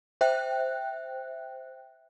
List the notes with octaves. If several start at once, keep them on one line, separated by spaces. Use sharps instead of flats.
C5 E5 G5 F#6